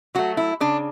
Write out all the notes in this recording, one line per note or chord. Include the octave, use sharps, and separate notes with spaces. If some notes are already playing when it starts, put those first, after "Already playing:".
F#3 A3 F#4
E4
C#3 D4